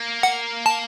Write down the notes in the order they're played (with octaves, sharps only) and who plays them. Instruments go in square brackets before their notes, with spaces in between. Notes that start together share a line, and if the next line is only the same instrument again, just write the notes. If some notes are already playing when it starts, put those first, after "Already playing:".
Already playing: [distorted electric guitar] A#3
[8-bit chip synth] F#5
A5